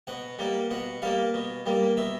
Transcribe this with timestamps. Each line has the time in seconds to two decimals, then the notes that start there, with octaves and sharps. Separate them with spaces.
0.07 B2 F#5
0.39 G3 A#3
0.71 B2 F#5
1.02 G3 A#3 F5
1.34 B2
1.66 G3 A#3
1.97 B2 E5